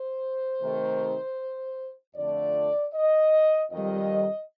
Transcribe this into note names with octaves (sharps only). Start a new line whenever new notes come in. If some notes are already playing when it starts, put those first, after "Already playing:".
Already playing: C5
C3 D#3 A3
F2 D3 A3 D5
D#5
F2 D#3 G3 D#5